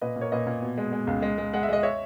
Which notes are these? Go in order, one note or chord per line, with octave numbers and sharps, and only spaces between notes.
A#2 B4 D#5
A#2
A#4 C#5
A#2 B4 D#5
A#2
B2
G#3
G#3
C#2
G#3
G#3
G#3 F#5
E5
G#3 D#5
C#5 E5